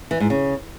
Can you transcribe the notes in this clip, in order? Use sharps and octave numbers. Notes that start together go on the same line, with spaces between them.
E3
G#2
C#3